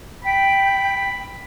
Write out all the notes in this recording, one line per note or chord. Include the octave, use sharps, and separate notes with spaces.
G5 B5